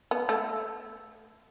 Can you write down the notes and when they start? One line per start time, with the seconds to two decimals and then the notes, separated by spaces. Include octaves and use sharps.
0.11 B3
0.29 A3